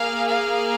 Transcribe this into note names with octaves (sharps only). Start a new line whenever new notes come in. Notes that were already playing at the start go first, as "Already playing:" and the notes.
Already playing: A#3 G#4 F5
F5